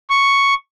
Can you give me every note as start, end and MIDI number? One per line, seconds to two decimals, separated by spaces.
0.10 0.54 85